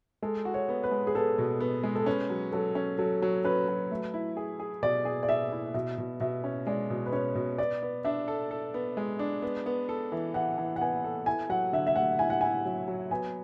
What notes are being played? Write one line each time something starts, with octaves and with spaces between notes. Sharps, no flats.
G#3 A4
F#4
C#5
B3
B4
G#3
G#4
B3 A4
B2
B3
G#3
A4
C#4 B4
F#3
F#3 A4
C#4
F#3 A4
F#3
C#4 B4
F#3
A3
E4
G#4
G#4
B2 D5
G#4
D5
G#4 E5
E4
B2 E5
B2
B2 E5
C#4
G#3 D5
B2
B4
C#4 C#5
B2
B3 D5
B3
D4 E5
A4
A4
B3
G#3
D4
B3
B3
A4
E3
E3 F#5
E3
F#5
B3 G#5
A4
E4 G#5
F#3 F#5
D3 E5
E5
A3 F#5
E4 G#5
F#5
E4 G#5
F#3
F#3
B3 G#5